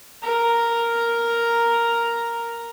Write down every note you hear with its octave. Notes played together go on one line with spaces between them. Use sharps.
A#4 A#5